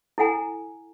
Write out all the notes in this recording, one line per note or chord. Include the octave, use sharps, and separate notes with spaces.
E4 A4 F#5 G#5 A#5